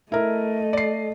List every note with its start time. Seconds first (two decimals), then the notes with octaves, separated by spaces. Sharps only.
0.12 A3 E4 A#4 D#5
0.73 D5 C7